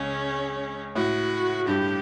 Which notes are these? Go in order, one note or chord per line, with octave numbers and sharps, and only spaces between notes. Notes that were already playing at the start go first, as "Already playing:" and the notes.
Already playing: C#2 C#3 C#4
A2 F#4
G2 G4